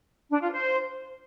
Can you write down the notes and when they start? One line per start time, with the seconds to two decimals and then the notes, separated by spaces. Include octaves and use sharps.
0.30 D4
0.41 F4
0.53 C5